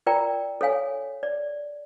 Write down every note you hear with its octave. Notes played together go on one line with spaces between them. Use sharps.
F4 A#4 D5 G5 A#5
A4 C#5 F5 G#5
D5